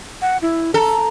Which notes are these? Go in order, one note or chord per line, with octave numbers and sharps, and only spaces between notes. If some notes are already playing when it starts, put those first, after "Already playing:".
F#5
E4
A4 A#5